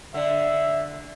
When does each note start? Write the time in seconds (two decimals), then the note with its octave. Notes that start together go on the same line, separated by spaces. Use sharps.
0.14 D3 E5